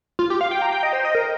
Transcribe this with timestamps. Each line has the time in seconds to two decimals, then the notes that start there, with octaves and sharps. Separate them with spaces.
0.19 F4
0.30 G4
0.41 F5
0.51 G5
0.62 A#5
0.72 G5
0.83 D#5
0.93 C5
1.05 D#5
1.15 A#4